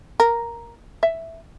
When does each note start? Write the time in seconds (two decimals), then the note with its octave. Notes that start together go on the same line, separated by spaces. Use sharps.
0.20 A#4
1.03 E5